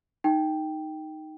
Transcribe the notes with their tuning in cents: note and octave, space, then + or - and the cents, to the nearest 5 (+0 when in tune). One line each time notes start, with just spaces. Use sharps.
D#4 +0 G5 +0